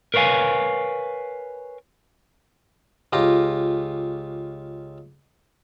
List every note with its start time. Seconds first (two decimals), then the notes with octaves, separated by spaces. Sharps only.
0.14 A#4 B4 C#5 F5 G#5
3.13 C#2 F4 G4 A#5